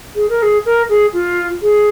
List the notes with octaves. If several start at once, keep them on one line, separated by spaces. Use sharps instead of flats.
G#4
A#4
G#4
A#4
G#4
F4
G#4